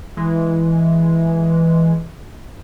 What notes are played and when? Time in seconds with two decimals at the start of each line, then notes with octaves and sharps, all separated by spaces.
0.17 E3 G#3